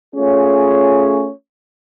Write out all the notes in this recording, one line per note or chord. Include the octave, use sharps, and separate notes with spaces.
A3 C#4 F4 G#4 C#5